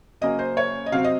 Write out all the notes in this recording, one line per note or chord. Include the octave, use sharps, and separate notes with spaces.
C#3 F#3 A#3 C#4 D#5
C5
C#5
D#5
C3 F#3 C4 F5
D#5